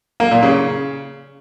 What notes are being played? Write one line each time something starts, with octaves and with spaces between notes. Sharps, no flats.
A#3
A#2
C#3